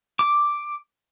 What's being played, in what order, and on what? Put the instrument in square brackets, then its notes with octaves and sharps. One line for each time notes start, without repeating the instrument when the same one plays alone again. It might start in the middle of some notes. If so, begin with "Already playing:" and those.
[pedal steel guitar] D6